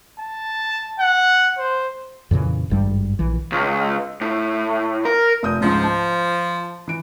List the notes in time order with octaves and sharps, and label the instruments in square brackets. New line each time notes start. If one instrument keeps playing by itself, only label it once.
[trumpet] A5
F#5
C5
[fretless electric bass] F2 A#2 C#3 E3
G#1 G2 G3
A#1 E3
[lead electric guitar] C#2
A2
A#4
[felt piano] F1 D#6 G6
[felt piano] C#2 G#2 [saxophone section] F3
[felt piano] A5
E3 D7